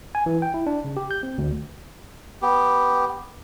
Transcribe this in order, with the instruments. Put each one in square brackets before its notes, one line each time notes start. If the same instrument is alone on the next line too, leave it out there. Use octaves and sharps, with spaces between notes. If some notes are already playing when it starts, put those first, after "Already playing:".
[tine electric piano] G#5
E3
G5
E4
D4
C#3
G4
G6
C4
D2
[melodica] B3 G4